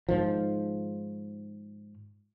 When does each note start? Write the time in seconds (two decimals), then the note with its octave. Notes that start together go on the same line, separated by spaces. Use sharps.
0.09 G#2 D#3 F3